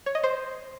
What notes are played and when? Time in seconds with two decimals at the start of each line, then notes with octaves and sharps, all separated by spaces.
0.06 C#5
0.15 D#5
0.23 C5